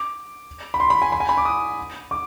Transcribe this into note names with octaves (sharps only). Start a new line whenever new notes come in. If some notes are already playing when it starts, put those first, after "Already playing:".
Already playing: D6
B5
C6
B5
G#5
B5
G#5
B5
D6
D#6
D6